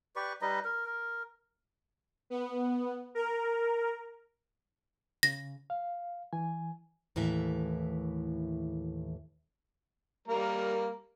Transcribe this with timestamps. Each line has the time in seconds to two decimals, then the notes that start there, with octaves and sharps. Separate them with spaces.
0.16 G4 B4 D5 C#6
0.42 G3 D#4 B4 D#5
0.64 A#4
0.86 A#4
2.30 B3
3.15 A#4
5.23 C#3 A#6
5.70 F5
6.33 E3 G#5
7.16 D#2 A2 E3 E5
10.28 G3 A#3 A#4